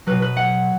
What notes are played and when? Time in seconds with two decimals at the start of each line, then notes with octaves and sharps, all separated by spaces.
0.06 B2 F#3 B4
0.22 B4
0.37 F#5